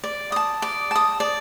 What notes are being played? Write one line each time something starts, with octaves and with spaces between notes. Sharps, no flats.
D5
A5 D#6
D5
A5 D#6
D5